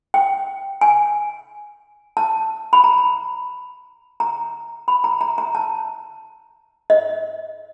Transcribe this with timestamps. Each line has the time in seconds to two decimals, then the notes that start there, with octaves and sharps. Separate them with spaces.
0.14 G5
0.81 G#5
2.17 A5
2.73 B5
2.84 A#5
4.20 A#5
4.88 B5
5.04 A#5
5.21 A#5
5.38 A#5
5.55 A5
6.90 D#5